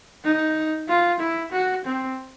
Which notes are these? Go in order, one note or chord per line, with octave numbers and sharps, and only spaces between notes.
D#4
F4
E4
F#4
C4